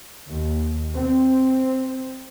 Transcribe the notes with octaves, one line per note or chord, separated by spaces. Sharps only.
D#2
C4